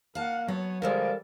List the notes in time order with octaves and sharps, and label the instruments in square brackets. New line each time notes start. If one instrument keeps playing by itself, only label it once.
[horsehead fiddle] A#3 F#5 [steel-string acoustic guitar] F5 A5
[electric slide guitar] F#3 [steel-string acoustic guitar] B3 [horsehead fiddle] C#5
[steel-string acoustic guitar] D3 F3 G#3 [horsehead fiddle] G3 D5 [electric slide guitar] A4 A#4 [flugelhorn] F5